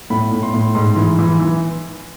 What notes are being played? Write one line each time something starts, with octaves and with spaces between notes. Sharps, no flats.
A2 B5
A2
C6
A2
G#2 C6
E3
E3
E3